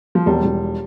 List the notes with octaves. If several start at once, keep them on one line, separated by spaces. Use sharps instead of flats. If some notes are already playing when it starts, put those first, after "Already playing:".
F3
E1 G3
E1